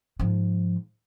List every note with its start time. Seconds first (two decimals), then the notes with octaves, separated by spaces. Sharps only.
0.19 G#2 F3